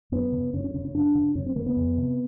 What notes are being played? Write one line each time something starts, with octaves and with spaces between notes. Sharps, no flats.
F#2 B3
C#3
F#2 C#4
C#4
C#3 C#4
C#4
F#2 D4
C#3
F#2 C#4
C4
C#3 A#3
B3
F2
C3